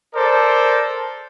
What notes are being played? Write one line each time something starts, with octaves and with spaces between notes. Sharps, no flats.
A4 A#4 C5 D5